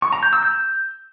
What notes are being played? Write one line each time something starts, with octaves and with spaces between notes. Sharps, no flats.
C#6
A#5
G6
E6
G6